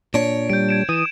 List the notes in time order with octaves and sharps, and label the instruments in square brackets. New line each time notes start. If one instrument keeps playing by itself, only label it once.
[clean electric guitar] A#2 D4 [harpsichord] C#5 [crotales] D7
[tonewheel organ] G3 [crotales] G6 D7
[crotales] G#6 D7 E7
[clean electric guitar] E3 [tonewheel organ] D#6 [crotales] D#7 E7